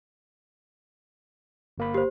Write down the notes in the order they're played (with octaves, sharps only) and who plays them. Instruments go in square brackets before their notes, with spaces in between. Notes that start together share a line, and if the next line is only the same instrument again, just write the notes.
[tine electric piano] G1 A#3 B5
[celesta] G4 C5